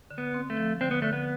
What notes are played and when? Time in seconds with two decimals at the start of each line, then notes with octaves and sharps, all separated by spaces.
0.11 D3
0.18 B3
0.34 C4
0.50 A3
0.57 F3
0.81 D3 C4
0.91 B3
1.02 D3 A3
1.13 B3